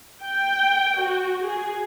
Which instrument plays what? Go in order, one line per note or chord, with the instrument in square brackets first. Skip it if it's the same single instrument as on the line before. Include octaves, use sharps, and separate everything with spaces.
[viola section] G5
F#4
G#4